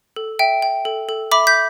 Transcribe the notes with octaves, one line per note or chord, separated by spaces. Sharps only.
A4
E5 G5
G5
A4
A4
E5 B5 D6
G6 B6